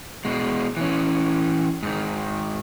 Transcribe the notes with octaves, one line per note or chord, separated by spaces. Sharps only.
B2 G#3
E3 C#4
G#2 D#3